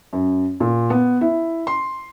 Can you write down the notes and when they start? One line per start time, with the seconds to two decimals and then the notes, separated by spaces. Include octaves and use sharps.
0.13 F#2
0.60 A#2
0.90 B3
1.21 E4
1.67 C6